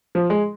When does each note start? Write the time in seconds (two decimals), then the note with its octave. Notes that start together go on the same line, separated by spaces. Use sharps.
0.15 F3
0.30 G#3